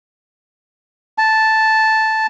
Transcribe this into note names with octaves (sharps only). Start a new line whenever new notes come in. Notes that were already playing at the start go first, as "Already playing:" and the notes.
A5